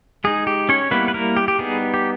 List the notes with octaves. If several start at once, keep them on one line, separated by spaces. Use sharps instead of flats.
G#3 D#4 G#4
G4
C#4 C#5
G3 A#3 B3 E4 B4
B4
A#3 A#4
G4
G4
G3 B3 D#4 G#4
G4